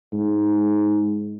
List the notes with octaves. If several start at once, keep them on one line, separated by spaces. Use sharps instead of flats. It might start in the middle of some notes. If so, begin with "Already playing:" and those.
G#2